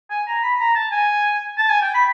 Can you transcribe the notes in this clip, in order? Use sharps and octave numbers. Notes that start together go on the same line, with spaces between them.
G#5
A#5
B5
A#5
A5
G#5
A5
G#5
G5
B5